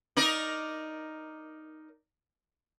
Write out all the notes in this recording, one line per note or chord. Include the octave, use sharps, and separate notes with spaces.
D#4 A#4 D5